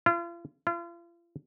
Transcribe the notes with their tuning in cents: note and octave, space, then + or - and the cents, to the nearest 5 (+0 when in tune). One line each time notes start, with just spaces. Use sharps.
F4 -40
F4 -40